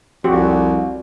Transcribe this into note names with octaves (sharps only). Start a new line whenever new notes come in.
C2 F2 C4 F#4 G4